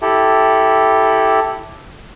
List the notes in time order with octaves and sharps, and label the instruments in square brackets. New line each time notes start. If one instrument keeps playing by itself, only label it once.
[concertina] E4 G4 A4